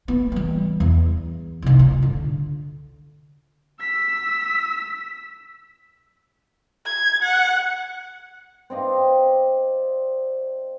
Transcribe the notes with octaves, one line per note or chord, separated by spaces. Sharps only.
B3
E3 G3
E2
C2 D#3
F4
D3
E6 B6
G#6
F#5
C4 D5 D#5 F5